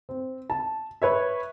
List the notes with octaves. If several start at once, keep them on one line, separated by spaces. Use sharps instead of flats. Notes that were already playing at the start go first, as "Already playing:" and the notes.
C4
A5
B4 C#5 E5